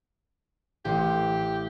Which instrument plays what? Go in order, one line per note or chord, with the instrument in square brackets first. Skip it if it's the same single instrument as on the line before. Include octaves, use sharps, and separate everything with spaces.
[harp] A1 C5 [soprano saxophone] G4